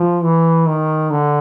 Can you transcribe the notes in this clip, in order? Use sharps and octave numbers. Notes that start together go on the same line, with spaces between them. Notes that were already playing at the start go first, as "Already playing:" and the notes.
Already playing: F3
E3
D#3
D3